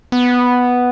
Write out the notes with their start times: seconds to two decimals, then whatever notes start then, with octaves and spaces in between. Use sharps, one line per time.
0.12 B3